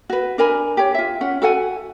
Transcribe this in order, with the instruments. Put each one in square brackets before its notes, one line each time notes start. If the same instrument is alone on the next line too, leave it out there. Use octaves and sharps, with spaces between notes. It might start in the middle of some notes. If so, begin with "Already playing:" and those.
[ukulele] F#4 B4
D4 A#4 G#5 B5
G4 C#5
F4 E5
C#4 F#5
F#4 A4 F#5 G#5